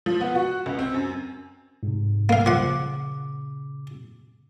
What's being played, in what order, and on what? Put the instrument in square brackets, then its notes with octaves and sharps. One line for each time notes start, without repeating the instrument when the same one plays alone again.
[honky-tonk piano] F3
B3
F#4
C#2
C4
F#2
[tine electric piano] G#2 C3
[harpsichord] A#3 F5
[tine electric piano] A#2 C#3 D6 [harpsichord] F3 F#5